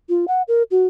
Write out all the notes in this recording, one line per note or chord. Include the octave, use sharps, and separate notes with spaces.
F4
F#5
A#4
F#4